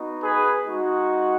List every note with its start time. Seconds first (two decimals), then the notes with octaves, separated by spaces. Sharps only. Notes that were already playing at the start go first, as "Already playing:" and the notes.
Already playing: B3 D#4 F#4
0.22 G#4 B4
0.68 G#3 D#4 F#4